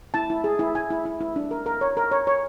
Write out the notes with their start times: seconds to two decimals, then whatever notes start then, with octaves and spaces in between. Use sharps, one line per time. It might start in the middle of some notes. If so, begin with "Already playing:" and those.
0.14 E4 A5
0.30 E4
0.44 G#4
0.59 E4
0.75 E4 G#5
0.90 E4
1.05 E4
1.21 E4
1.36 D4
1.51 A#4
1.66 A#4
1.81 C#5
1.97 A#4
2.11 C#5
2.27 C#5